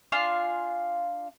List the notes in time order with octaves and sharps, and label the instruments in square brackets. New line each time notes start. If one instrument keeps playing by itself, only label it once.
[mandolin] D4 F4 F5 G#5